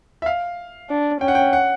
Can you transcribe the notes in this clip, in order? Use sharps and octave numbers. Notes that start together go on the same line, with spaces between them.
E5
F5
D4
C#4 G5
F#5
G5
F#5